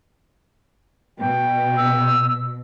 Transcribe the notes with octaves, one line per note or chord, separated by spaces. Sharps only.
B2 G5
E6